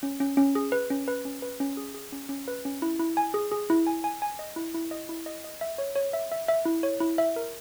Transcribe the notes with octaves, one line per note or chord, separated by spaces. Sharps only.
C#4
C#4
C#4
G#4
B4
C#4
B4
C#4
B4
C#4
G#4
G#4
C#4
C#4
B4
C#4
E4
E4
G#5
G#4
G#4
E4
G#5
G#5
G#5
D#5
E4
E4
D#5
E4
D#5
D#5
E5
C#5
C#5
E5
E5
E5
E4
C#5
E4
E5
A#4